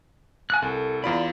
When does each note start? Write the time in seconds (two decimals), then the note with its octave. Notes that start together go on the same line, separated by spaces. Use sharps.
0.50 G#5 F#6
0.62 C2 A4
1.04 E2 F4 D5 B5